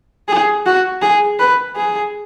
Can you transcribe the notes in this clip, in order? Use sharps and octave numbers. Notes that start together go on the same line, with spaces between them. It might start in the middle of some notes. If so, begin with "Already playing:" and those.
G#4
F#4
G#4
B4
G#4